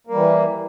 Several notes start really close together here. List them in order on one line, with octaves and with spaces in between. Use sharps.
A#3 G3 E3